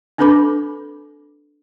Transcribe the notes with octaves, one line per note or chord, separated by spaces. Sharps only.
C4 D4 A4 B4 B5 D6